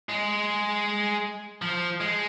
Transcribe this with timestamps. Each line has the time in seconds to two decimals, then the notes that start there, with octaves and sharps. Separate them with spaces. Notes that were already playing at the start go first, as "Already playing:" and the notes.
0.09 G#3
1.62 F3
2.01 G#3